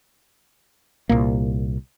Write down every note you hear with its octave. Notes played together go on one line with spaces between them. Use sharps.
C2 A#2 A#3